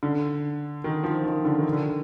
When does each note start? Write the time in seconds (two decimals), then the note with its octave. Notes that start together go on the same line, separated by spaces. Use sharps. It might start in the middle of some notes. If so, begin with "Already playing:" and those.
0.03 D3
0.84 D#3
1.03 F3
1.24 D#3
1.45 D3
1.59 D#3
1.73 D3